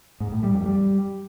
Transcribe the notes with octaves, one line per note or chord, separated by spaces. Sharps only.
G#2
A2
G3
F2
G3